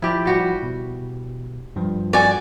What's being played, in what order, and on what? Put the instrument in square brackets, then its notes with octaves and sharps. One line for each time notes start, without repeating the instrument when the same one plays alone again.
[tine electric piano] F3 [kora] E4 G4 D5
[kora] G3 F#4 G4
[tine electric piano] B2
G2 F3
[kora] F#4 A4 [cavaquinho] D5 G#5